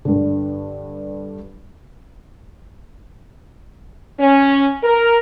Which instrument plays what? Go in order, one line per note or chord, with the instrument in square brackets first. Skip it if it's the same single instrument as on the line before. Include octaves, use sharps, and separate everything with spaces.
[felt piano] G2 D3
[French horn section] C#4
A#4